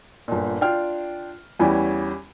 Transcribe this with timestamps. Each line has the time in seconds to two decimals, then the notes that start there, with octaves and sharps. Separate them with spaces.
0.28 G1 A#2
0.61 D4 F4 G5 F6
1.59 E2 E3 G3 C#4